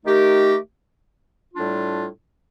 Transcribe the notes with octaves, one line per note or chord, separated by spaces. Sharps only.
D#3 A3 D#4 G4 A#4
A2 G3 D4 F4